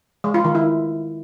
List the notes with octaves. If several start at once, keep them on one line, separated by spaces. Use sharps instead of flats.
G#3
F4
D#3
E4